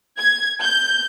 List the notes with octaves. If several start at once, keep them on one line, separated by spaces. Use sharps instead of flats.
G#6
G6